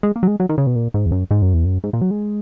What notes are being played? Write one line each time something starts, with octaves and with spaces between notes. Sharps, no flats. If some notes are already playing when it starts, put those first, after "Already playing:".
G#3
A#3
F#3
G#3
F#3
D#3
C#3
B2
A#2
G#2
E2
F#2
G#2
F#2
E2
F#2
G#2
A#2
F#3
G#3